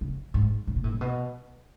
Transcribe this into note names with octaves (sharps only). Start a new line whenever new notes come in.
C#3
G#2
A2
A#2
A2
A#2
B2